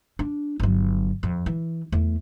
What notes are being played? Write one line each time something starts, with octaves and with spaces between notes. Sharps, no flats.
D4
G1 F#3
F2
E3
E2 A3